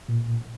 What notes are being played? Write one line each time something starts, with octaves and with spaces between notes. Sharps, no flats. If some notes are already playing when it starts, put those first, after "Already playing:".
A#2